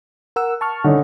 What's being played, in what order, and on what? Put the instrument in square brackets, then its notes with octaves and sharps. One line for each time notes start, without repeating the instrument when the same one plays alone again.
[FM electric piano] A#4 F#5 E6
A5 C#6 F6
[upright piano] D3 C#4 D#4